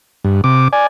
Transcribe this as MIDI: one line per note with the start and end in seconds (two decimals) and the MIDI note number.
0.24 0.41 43
0.44 0.68 48
0.44 0.68 86
0.73 0.87 74
0.73 0.87 80